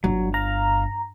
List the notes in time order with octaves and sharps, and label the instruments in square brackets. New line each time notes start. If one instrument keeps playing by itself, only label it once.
[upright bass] G1 [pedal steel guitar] F#3
[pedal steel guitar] F5 [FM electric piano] A#5